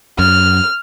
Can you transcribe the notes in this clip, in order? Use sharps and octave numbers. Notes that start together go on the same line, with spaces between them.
F#2 F6